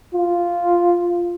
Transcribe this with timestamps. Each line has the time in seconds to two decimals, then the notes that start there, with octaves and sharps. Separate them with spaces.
0.15 F4